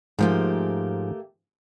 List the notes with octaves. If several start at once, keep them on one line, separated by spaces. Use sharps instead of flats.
G#2 F3 A3 A#3 G4